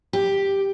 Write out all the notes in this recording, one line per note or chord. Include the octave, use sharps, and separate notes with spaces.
G4